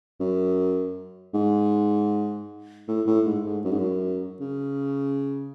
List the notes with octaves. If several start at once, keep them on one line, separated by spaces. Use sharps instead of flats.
F#2
G#2
A2
A2
G#2
G#2
F#2
G#2
F#2
C#3